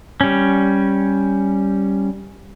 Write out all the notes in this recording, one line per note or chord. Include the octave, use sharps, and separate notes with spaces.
G3 C#4